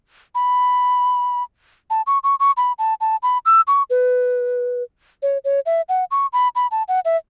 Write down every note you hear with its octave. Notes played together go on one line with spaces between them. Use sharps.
B5
A5
C#6
C#6
C#6
B5
A5
A5
B5
E6
C#6
B4
C#5
C#5
E5
F#5
C#6
B5
B5
A5
F#5
E5